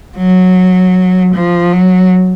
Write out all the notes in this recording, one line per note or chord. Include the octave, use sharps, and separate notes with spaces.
F#3
F3
F#3